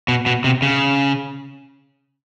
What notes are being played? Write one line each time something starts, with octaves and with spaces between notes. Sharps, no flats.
B2
B2
C3
C#3